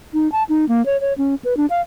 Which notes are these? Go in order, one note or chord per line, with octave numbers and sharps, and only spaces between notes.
D#4
A5
D#4
A#3
C#5
C#5
C#4
B4
D4
F5